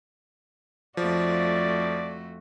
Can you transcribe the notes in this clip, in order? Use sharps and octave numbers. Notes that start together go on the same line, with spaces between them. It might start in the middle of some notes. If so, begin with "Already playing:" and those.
F2 F3 A3 F#4 D5